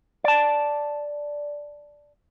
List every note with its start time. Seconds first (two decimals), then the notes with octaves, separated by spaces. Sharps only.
0.24 D5 A5